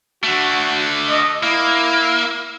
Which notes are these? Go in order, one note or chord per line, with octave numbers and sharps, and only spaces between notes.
D3 A3 F#4
D#5
A#3 E4